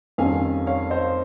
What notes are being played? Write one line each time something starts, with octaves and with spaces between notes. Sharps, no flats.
F2 D#3 G3 C#4 F5 G#5
C#5 F5
C5 D#5